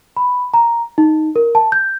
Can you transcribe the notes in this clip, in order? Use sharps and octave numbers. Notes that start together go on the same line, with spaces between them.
B5
A#5
D#4
A#4
A5
G6